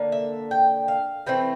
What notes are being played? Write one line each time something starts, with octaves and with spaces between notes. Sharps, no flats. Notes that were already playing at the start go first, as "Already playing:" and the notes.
Already playing: D3 A#3
E5
G5
F5
E3 A3 C4 G5